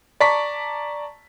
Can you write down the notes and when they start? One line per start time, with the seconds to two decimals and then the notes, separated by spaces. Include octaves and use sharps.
0.20 D5 A5 A#5 C#6 B6